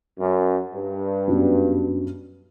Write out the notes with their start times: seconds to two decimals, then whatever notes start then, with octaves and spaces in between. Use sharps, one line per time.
0.19 F#2
0.73 G2
1.28 F#2 F#3 B3 D4 F#4